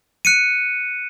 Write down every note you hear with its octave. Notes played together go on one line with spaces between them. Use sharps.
F#6 C#7 D#7